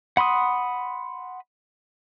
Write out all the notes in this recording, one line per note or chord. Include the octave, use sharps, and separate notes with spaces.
F#5 B5 C6 D#6